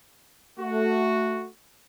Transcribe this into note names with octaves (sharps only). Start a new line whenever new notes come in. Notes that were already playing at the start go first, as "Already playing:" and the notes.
A3 F#4